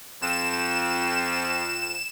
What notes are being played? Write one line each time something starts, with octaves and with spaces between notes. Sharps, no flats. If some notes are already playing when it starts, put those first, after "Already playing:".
F2 E7